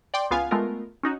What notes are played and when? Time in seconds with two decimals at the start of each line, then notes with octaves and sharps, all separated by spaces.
0.14 D5 G5 C6 D6
0.31 C#2 B3 F4 F5 G#5
0.51 G#3 A3 B3 F4 A#4
1.03 C#4 D#4 F#4